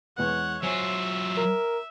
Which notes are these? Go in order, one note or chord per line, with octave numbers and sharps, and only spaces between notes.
E2 G#3 B3 C#5 F#5
F#3 F4 C5 C#5 E5 G#5
A#4